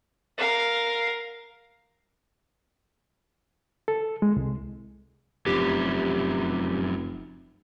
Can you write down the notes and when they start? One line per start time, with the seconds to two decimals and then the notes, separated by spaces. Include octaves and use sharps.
0.38 A#4 F5
3.88 A4
4.22 G#3
4.36 C2
5.46 F1 F#2 E3 G4